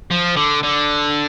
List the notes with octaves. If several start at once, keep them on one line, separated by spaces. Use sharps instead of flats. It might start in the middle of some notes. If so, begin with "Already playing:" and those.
F3
D3
D3